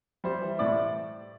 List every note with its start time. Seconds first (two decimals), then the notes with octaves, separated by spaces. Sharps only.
0.24 G3 C5
0.41 E3
0.59 A2 D5